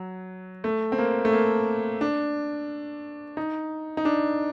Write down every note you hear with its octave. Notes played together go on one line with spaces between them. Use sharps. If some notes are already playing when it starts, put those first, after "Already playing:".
Already playing: F#3
A3
C4
A#3
A3
A#3
D4
D#4
D#4
D4